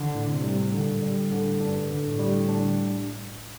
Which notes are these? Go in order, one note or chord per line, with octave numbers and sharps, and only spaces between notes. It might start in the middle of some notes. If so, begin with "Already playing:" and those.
Already playing: D3 D4
A2
C3
G3
A#2 D3
G3
A2
D3
G2 D4
D3
A2
G3
D4